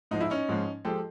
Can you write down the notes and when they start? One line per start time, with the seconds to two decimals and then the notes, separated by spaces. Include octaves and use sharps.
0.11 G#2 F3 G#3 D#4
0.20 E4
0.30 C#4 D#4
0.49 G#2 F3 G#3
0.85 F3 G#3 G4 A4